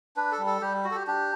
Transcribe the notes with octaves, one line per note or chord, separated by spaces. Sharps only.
D4 B4
A4
G3
A4
G3 G4
F#4
A4
G4
D4 G4